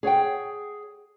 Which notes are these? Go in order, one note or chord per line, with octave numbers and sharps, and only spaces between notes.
G#4 C#5 F#5 G5